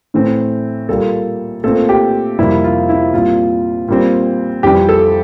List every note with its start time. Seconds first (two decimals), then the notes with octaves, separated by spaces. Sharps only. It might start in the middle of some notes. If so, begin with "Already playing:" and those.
0.14 A2 E3 A3 C4
0.88 A#2 G3 A#3 A4
1.64 A#2 A3 C4 A4
1.89 G4
2.39 F2 C3 G3 A#3 E4
2.64 F4
2.89 E4
3.14 A#2 G3 C4 F4
3.88 A#2 G3 C4
4.63 F2 E3 G3 C4 G4
4.89 A4